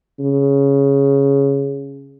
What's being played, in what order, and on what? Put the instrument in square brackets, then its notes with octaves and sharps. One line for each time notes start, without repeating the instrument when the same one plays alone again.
[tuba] C#3